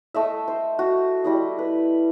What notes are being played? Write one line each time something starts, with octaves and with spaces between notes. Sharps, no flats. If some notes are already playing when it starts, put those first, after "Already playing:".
A3 D#5 E5
C5
F#4
G3 E4 D#5
B4